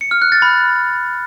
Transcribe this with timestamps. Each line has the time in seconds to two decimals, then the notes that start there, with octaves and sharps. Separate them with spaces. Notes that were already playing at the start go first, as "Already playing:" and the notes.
0.01 C#7
0.11 F6
0.22 F#6
0.32 A6
0.42 B5